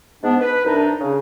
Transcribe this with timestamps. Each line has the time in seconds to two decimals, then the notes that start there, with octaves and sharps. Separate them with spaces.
0.23 G#2 B3 D4
0.40 B4
0.65 C2 D4 D#4
1.00 C#3